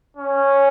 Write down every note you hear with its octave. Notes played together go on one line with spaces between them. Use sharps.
C#4